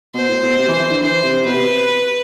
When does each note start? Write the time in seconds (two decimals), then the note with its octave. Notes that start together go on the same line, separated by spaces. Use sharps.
0.14 B2 C5
0.29 A2
0.43 B2
0.58 C3
0.69 E3
0.80 E3
0.91 D3
1.02 E3 C5
1.23 C3
1.46 B2 B4
1.54 C3